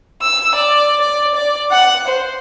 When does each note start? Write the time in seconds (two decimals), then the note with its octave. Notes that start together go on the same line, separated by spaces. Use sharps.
0.22 E6
0.55 D5
1.01 D5
1.35 D5
1.71 F#5
2.08 C5